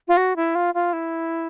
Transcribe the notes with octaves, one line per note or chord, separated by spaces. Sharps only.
F4
F#4
E4
F4
F4
E4